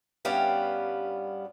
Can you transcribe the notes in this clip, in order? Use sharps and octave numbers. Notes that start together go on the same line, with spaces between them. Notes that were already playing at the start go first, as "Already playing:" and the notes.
G2 G3 B3 C#4 G4 F5